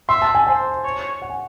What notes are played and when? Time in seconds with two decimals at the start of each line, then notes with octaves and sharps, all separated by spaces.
0.09 E5 C6
0.22 A5
0.35 G#5
0.47 C5 G#5
0.84 C#5
1.22 F#5
1.30 G#5